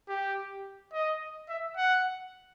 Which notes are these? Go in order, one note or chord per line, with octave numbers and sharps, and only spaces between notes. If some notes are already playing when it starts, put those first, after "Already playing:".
G4
D#5
E5
F#5